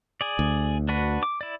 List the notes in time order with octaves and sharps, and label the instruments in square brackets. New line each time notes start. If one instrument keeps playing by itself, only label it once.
[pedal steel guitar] G#4 D5
[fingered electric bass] D2
[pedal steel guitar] D4 F#4 B4
D6
E4 D5